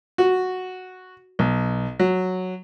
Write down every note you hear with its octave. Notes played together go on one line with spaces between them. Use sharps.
F#4
B1
F#3